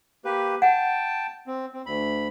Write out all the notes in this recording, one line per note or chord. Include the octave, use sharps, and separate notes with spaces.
A#3 G4 B4
F#5 G5 A5
C4
C4
D2 B5